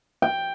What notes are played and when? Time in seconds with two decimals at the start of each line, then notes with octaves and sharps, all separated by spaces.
0.22 G5